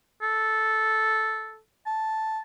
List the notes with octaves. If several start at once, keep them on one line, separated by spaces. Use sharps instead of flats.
A4
A5